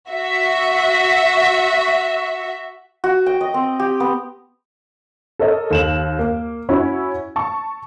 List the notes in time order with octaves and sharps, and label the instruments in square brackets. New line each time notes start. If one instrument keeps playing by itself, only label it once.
[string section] F#4 E5
[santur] F#4
G5
D#5
C4
G4
B3
[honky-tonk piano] A4 A#4 C#5 D#5
D#2 E7 F#7
A#3
C#4 E4 F#4 C#5
A5 C#6